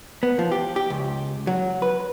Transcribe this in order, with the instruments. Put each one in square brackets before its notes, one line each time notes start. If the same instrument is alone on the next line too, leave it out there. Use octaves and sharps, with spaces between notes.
[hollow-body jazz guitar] B3
F3
G4
G4
C#2
F#3
B4